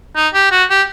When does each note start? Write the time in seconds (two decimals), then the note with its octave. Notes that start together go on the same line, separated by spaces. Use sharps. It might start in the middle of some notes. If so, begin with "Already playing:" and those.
0.16 D#4
0.34 G4
0.51 F#4
0.70 G4